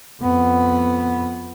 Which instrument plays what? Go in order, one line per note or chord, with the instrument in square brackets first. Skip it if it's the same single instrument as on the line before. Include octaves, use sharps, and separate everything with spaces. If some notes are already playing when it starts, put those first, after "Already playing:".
[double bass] F2 B3